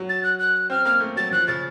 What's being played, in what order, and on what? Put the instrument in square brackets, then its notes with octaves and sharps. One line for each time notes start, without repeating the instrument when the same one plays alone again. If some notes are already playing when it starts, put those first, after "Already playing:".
Already playing: [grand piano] F#3
[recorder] A6
F#6
F#6
[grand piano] C4 [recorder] F6
[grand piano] A#3 [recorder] F6
[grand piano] A3
[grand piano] F#3 [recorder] A6
[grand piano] F3 [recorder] F#6
[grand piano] C#3 [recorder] A6